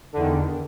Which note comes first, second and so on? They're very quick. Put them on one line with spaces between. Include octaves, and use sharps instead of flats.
D3 E2 D#3